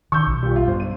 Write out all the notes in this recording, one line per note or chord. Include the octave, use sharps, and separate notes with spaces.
D#3 C#6 E6 G6
B1
A#2 G3
F4
G1 G2 C5
D#7